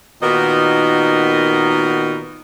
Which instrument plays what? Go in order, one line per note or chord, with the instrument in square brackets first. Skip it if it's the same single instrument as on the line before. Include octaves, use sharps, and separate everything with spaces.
[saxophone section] A#2 D#3 B3 D#4 F#4 A#4